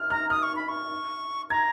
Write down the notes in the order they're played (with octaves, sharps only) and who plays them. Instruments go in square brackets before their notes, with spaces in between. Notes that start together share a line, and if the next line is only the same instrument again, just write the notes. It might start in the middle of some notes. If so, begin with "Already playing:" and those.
Already playing: [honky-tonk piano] F6
[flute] A#5 [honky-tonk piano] F6
[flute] D#6 [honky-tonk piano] F6
[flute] C#6
B5
C#6
[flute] A#5 [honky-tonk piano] G#6